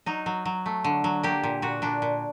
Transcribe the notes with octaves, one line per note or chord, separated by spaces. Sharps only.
F#3 D#4
F#3
F#3
A3
D3
F#3
A#3 G4
A#2
A#2 F#4
A#2 D4
A#2